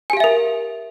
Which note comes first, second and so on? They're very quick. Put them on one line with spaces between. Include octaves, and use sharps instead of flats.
G#5 G4 F5 E5 A#4